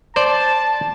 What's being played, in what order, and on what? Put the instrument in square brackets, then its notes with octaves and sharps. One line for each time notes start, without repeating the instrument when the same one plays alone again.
[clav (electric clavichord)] C5 D5 [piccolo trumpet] A5